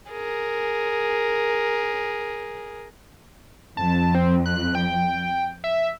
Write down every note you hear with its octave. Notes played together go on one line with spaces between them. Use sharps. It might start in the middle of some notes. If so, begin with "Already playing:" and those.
G#4 A#4
F2 A5
C4
F#6
G5
E5